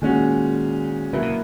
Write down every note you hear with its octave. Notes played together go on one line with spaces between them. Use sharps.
A#2 D#3 G#3 C#4 F#4
C#3 F#3 A#3 E4 B4
B2